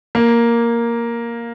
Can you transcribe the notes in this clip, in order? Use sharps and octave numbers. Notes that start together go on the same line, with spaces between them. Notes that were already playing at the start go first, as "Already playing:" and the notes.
A#3